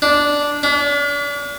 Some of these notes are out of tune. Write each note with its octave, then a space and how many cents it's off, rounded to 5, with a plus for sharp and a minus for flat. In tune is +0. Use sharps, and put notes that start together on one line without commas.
D4 -10
D4 -40